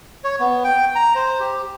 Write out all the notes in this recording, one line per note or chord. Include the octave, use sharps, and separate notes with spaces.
C#5
B3
G5
A#5
C5
G4